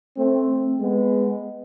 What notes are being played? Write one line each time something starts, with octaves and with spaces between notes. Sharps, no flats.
A3 C4
G#3 B3